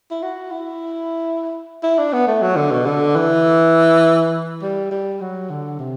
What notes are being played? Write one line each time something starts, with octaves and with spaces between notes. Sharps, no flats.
E4
F#4
E4
E4
D4
B3
A3
F#3
D3
B2
D3
E3
G3
G3
F#3
D3
C3